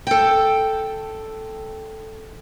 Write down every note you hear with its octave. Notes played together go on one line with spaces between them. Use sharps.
A4 G5